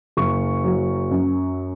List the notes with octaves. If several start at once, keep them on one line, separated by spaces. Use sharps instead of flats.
F#1 C#6
F#3
F#2